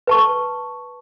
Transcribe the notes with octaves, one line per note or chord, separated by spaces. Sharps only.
B4 A5 C#6